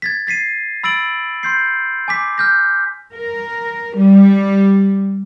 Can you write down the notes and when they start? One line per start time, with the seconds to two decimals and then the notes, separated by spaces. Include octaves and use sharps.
0.02 G#6 A6 B6
0.27 A6 B6 C7 D#7
0.84 B5 E6 A6 D7 F#7
1.43 C6 G6 C7
2.08 G#5 D6 B6
2.38 F6 G6 A#6
3.12 A#4
3.96 G3